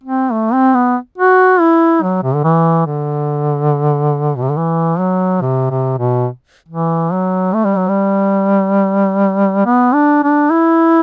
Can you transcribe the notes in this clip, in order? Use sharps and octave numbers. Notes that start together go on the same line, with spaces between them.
C4
A3
C4
B3
F#4
E4
F#3
C3
D3
E3
D3
B2
C3
D3
E3
F#3
C3
C3
B2
E3
F#3
A3
G3
F#3
G3
B3
D4
D4
E4